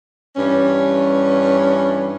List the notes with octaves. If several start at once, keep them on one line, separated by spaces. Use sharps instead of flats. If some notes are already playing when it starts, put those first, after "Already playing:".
G2 E3 C#4